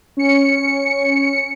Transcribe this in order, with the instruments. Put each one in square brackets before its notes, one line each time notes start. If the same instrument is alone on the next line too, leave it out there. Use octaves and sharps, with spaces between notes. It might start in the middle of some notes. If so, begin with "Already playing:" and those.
[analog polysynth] C#4 C#7